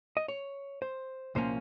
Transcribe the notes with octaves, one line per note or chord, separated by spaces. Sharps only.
D#5
C#5
C5
C2 A#2 F3 A#3 C#4 C5